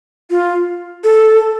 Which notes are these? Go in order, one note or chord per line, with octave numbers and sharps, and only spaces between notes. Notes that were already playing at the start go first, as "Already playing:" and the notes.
F4
A4